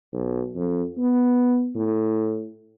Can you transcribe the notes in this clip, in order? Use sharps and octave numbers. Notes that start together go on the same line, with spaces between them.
B1
F2
B3
A2